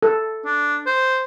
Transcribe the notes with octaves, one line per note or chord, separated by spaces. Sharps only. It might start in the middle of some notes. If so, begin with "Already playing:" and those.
A4
D4
C5